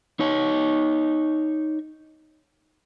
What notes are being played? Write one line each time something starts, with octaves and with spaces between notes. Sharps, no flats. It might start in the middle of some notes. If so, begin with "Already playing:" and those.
D#4 C#5